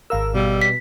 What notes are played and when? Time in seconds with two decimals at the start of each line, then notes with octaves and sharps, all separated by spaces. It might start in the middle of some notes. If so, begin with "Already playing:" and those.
0.10 G#1 A#4 F5 E6
0.35 B2 G3
0.62 B6